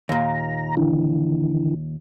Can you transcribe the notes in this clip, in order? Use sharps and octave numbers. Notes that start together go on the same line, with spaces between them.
D#2 A#2 A#5
D3 E3